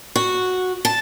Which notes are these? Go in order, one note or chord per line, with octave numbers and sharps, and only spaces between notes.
F#4
A5